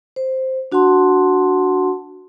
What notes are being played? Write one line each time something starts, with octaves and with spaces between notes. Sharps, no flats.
C5
D4 F#4 F#5 A5 C6